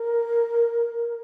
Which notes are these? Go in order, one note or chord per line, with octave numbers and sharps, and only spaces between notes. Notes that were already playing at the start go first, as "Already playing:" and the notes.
Already playing: A#4